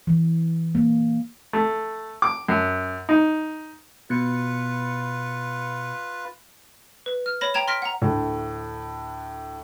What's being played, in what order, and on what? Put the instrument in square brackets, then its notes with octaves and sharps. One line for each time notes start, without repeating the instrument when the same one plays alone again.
[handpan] E3
A#3
[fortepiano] A3
D6
F#2
D#4
[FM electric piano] B2 C#7 [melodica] F4 B4
[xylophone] B4
F6
C#5 B5 A#6
G5 A#5 G#6 E7
C6 F6 A#6 B6 D7
F#5 A#5
[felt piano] D2 A2